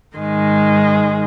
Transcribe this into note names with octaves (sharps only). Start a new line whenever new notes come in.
G#2 D#3 G#3